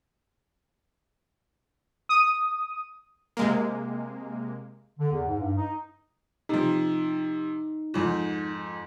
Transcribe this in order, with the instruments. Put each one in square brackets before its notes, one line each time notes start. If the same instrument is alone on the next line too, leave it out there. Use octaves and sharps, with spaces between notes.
[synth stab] D#6
[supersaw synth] C3 G#3 A#3
[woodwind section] D3
E2
G#2
G2
D#4
[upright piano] C3 F3 [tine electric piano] D#4
[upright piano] F2 G#2